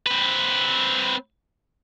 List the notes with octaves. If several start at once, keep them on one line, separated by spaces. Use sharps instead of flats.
C4 B4